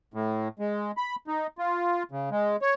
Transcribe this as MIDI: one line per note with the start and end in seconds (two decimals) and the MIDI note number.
0.14 0.48 45
0.59 0.91 56
0.97 1.16 83
1.27 1.47 63
1.58 2.03 65
2.11 2.29 49
2.31 2.56 56
2.62 2.74 73